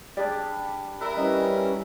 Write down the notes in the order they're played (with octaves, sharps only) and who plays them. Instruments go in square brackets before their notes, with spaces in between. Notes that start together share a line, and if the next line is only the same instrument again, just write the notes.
[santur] G3 D4 [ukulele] G#4 D5
[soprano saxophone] A#4 [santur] B4 E5 [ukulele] D5
[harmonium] E3 G3 C#4 [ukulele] D#5